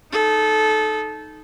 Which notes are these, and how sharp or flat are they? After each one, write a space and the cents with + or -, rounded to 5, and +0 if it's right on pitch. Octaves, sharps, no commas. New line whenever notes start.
D#4 +0 A4 -20